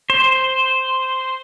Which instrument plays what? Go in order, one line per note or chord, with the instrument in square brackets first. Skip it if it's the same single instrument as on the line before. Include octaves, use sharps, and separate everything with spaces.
[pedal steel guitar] C5